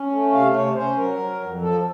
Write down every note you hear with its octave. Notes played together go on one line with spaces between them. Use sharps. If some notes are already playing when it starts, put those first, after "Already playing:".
Already playing: C#4
A3
C3 F5
C3 C#5
C#4 C5
F#3 A#4
F#3
F2
F3 A4